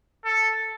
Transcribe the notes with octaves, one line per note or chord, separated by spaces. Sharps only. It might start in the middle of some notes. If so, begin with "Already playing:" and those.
A4